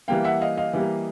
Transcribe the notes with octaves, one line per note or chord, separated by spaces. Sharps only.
E3 G3 A#3 F5 G5
E5 F#5
D#5 F5
D#5 F5
E3 G3 A#3